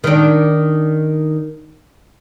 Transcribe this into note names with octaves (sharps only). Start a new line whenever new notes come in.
D#3 D4